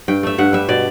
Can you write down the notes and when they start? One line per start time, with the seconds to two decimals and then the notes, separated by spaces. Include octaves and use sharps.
0.08 G2 G5
0.23 A3 E5
0.38 G2 F#5
0.53 G3 E5
0.69 B2 D5